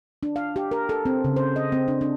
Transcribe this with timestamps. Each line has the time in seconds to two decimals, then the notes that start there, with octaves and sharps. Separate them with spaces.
0.23 D4
0.36 F5
0.56 G4
0.71 A#4
0.89 A4
1.05 C4
1.24 C#3
1.36 C5
1.56 D#5
1.72 C4
1.88 D4
2.01 D4